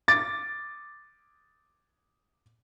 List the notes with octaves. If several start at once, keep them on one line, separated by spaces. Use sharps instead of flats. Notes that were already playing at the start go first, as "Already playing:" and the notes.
D6 A6